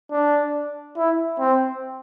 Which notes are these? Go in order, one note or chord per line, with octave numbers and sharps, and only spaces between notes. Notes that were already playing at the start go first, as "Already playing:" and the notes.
D4
E4
C4